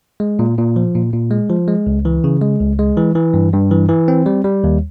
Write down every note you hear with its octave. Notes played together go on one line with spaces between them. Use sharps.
G#3
A#2
A#2
F3
A#2
A#2
G#3
F3
G#3
C#2
E3
C#3
G#3
C#2
G#3
E3
E3
G2
G2
E3
E3
C4
G3
G3
D#2